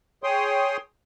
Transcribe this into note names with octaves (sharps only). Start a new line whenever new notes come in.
G#4 C#5 G5 C6 D#6